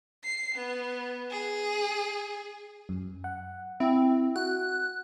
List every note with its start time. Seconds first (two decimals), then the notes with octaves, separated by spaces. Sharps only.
0.24 C7
0.55 B3
1.30 G#4
2.89 F#2
3.24 F#5
3.80 C4 E4
4.36 F#4 F#6